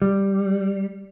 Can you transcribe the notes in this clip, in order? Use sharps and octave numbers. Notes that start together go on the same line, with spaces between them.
G3